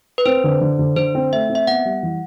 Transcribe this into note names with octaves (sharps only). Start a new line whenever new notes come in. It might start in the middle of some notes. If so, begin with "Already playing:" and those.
B4
C4 C5
D3
D3
D3
D3 C5
C4
A3 E5
C4
E5
B3 F#5
G3
E3